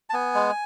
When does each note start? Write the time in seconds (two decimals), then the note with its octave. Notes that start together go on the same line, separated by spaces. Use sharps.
0.10 A5
0.13 B3 G#5
0.35 G#3